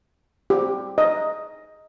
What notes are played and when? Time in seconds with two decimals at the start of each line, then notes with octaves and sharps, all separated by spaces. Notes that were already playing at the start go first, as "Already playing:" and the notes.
0.50 G4
0.98 D#5